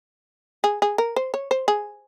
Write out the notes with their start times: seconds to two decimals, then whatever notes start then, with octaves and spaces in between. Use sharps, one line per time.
0.64 G#4
0.82 G#4
0.98 A#4
1.16 C5
1.34 C#5
1.51 C5
1.68 G#4